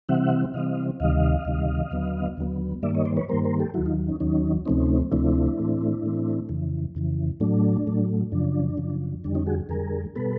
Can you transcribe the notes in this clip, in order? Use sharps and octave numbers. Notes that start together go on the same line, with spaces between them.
C3 E3 G3 C4 E5 F#5
C3 E3 G3 C4 D#5 F5
D2 C3 D#3 G3 D#5 F5
D2 C3 D#3 G3
D#2 D3 F#3 B3
D#2 D3 F#3 B3
G2 D#3 G3 A#3 D5 E5
C#5 D#5
C5 D5
B4 C#5
G2 D#3 G3 A#3 A#4 C5
A#4 C5
G4 A4
D#2 D#3 F#3 E4 F#4
D#4 F4
C#4 D#4
D#2 D#3 F#3 C#4 D#4
D2 C3 F3 A3 C4 C#4 D#4
D2 C3 F3 A3 C4 D4 E4
A2 E3 A3 C4
A2 E3 A3 C4
F2 C#3 E3
F2 C#3 E3
A2 F#3 A3 D4
A2 F#3 A3
F#2 C#3 F3 D4
F#2 C#3 F3
F2 D3 G3 D4
C#4 D#4
F#4 G#4
F2 D3 G3 G#4 A#4
B2 G3 B3 A4 B4